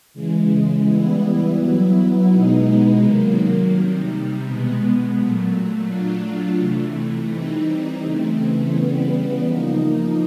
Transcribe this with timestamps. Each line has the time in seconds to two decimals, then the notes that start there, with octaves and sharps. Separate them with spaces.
0.14 C#3 E3 G#3
0.85 E3 G3 B3 E4
1.56 F#3 B3 E4
2.27 B2 G#3 B3 D#4
2.99 C3 D#3 F#3 A#3
3.71 C3 D#3 G3
4.42 B2 G#3 B3
5.13 A#2 F#3 A3
5.85 F#3 A3 D4 F4
6.57 C3 E3 A3
7.28 E3 G3 C4 D#4
7.99 C#3 E3 A3 C4
8.71 C#3 E3 G3 B3
9.42 F3 A#3 D#4